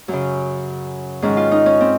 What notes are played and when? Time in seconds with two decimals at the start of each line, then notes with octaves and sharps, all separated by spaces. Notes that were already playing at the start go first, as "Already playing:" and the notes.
0.08 F#2 C#3 F#3
1.22 G#2 D#3 C#4
1.37 F4
1.51 D#4
1.66 C#4
1.81 C4